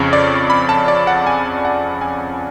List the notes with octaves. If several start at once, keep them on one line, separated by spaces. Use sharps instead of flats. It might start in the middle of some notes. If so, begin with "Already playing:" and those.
Already playing: F2 C#3 C#5
D5
B5
A5
D5
F#5
G#5
F#5
G#5